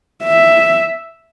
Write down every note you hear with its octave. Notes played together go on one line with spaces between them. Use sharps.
E5